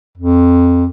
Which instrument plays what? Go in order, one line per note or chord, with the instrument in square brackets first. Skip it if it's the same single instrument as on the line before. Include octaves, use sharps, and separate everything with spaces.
[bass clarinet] F2